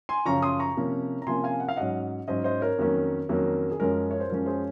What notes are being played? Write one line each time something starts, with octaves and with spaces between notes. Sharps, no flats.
G#5 C6
F#2 C#3 F3 A#5 C#6
C6 D#6
A#5 C#6
C3 F3 A#3 C#4
A#5
C3 F3 A#3 C#4 G#5 C6
F5 G#5
F#5
F5
G#2 F#3 C#4 D#5 F#5
G#2 F#3 C#4 C5 D#5
C5 D#5
A#4 C#5
F2 D#3 F#3 A#3 C#4
F2 D#3 F#3 A#3 C#4
G#4
F#2 F3 G#3 C#4 A#4
C#5
C5
F#2 F3 G#3 C#4 A#4
G#4 C5